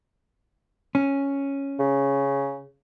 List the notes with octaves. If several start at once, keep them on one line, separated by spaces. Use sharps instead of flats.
C#4
C#3